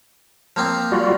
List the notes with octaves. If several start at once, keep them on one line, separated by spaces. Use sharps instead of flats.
F3 A#3 C4
G3 F4 F#4